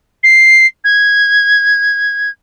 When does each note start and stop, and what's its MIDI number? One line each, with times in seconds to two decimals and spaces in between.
0.23 0.66 96
0.84 2.30 92